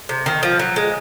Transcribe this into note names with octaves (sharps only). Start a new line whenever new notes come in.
C3
D#3
F3
F#3
G#3